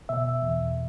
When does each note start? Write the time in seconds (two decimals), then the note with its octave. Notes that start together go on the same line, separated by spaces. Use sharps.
0.09 B2 E5
0.42 E2